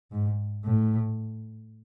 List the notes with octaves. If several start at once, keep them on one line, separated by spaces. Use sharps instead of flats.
G#2
A2